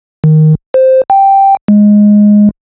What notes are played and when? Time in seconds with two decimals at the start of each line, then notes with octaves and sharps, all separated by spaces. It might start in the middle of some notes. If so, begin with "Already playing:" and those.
0.24 D#3
0.74 C5
1.10 G5
1.68 G#3